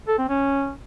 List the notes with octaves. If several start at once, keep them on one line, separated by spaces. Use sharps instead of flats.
A4
C4
C#4